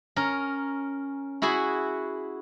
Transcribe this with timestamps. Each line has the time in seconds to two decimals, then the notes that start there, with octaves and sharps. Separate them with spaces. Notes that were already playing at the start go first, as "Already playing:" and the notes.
0.16 C#4 A#4
1.42 E4 F#4 G#4 G#5 B5